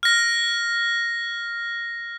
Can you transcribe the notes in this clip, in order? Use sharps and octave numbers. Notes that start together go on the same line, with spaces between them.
F6 A#6